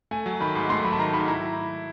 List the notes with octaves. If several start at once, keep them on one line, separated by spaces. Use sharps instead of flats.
A3 G#5
F#3
D#3 B5
G#2
A3 C6
F#3 B5
A5
D#3 A#5
G#2 B5
E4 A#5